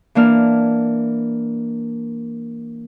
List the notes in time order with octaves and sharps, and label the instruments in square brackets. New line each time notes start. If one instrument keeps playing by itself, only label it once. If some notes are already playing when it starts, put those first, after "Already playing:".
[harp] E3 A#3 D4 F6